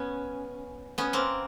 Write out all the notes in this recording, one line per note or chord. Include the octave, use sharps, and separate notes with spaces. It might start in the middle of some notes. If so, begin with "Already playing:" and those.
Already playing: B3 C#4
B3 C#4
A#3 C4